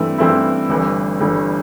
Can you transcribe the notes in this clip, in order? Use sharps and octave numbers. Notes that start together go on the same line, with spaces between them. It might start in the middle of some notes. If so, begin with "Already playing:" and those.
Already playing: G2 E3 A3 C4 E4
G2 E3 A3 C4 E4
G1 G2 E3 A3
G1 G2 E3 A3